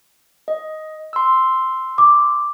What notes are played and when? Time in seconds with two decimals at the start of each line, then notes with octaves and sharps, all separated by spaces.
0.48 D#5
1.13 C6 E6
1.98 D6